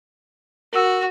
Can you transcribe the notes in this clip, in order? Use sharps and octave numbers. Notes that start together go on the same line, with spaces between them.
F#4 A#4 E6